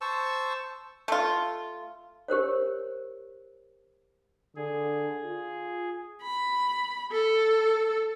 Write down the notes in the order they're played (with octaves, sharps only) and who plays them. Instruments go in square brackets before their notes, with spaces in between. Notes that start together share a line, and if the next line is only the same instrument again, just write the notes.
[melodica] C5 A5 C#6 E6
[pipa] A3 F4
[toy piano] G4 A#4 C5 C#5
[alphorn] D3 [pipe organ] G#4
[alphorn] F4
[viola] B5
A4